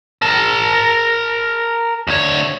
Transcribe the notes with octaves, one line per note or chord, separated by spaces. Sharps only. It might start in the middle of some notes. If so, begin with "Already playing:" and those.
A#4 A5
D2 C#5